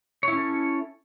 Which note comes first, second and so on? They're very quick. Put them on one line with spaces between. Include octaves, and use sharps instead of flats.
C#5 E4 C#4 A4